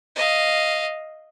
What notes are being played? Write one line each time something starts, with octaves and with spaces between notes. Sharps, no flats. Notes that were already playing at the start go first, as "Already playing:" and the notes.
D#5 F5